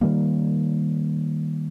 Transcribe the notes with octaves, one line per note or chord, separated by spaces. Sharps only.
D#3 G3 A#3